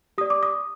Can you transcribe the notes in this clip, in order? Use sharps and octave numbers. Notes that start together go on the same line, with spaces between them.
G4 D5 D#6
D6
D#6